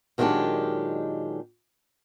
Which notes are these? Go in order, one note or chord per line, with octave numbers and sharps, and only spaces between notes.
A#2 D#3 F#3 G#3 D4 G4